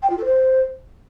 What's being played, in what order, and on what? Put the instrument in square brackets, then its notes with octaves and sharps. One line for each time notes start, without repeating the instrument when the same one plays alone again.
[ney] G5
F4
A4
C5